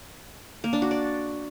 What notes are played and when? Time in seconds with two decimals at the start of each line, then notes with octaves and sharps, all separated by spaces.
0.64 A#3
0.73 D4
0.82 F#4
0.91 D5